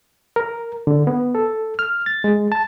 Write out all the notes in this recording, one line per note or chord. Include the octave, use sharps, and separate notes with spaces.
A#4
D3
B3
A4
F6
A6
G#3
A5